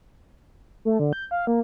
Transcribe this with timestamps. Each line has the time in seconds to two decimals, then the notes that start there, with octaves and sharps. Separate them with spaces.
0.85 A3
1.00 D3
1.13 G6
1.31 F5
1.47 A#3